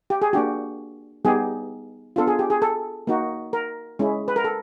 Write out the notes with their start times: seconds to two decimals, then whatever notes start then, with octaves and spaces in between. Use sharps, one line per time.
0.10 G4
0.22 G#4
0.33 A#3 D4 F#4 G4
1.25 G3 B3 D#4 G4 G#4
2.16 B3 D4 F4 A4
2.27 G#4
2.39 G4
2.50 G#4
2.62 A4
3.07 A#3 D#4 F#4
3.53 A#4
3.99 G#3 C#4 E4
4.28 B4
4.36 A#4
4.44 A4